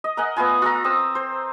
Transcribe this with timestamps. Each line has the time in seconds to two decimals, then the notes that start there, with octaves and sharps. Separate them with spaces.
0.04 D#5
0.17 A#4 D#5 F#5 G#5
0.37 A3 B3 F4 G#5
0.62 F4 A4 A#5
0.84 C4 D#6 E6
1.15 C5